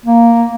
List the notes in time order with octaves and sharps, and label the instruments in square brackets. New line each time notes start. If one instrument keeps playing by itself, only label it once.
[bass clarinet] A#3